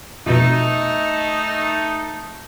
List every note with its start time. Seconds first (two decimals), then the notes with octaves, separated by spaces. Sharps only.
0.26 F2 B2 A3 D#4